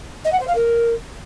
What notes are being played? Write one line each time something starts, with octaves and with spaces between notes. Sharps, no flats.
D#5
F#5
C5
F5
A#4